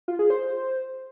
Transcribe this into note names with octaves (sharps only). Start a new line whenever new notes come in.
F4
G#4
C5